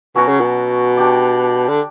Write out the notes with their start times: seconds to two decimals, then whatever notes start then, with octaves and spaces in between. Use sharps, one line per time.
0.15 B2 F#3 C#4 F#4 C#5
0.28 C#3
0.40 B2
0.97 D4 G4 D5
1.69 D3